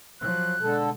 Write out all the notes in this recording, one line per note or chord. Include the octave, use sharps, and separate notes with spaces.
F3 F#3 F#6
B2 D3 G#3 A4